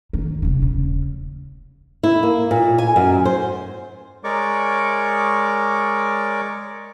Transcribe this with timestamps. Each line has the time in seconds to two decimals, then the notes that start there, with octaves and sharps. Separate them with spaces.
0.13 D#3
0.42 D#1 C2
0.62 D#1 C#3
2.03 E4
2.23 A#3
2.51 A#2
2.78 G#5
2.96 F#2
3.25 C5
4.24 G#3 A#4 C#5 D5 C#6 D6